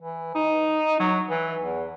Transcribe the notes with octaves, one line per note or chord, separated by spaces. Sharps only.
E3
D#4
F#3
E3
E2